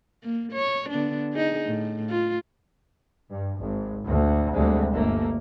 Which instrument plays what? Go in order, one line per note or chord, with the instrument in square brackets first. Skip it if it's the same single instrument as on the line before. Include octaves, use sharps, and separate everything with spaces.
[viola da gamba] A#3
C#5
D3 B3 D4
D#4 G#4
A2
F4
[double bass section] G2
G#1
D2
D2 C3 G3 G#3
G1 A3 A#3